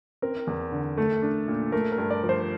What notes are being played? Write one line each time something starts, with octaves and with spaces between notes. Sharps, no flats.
C4 A#4
E2
D3
A3 A4
D4
A#2
A3 A#4
A#4
G2
D5
F3
C5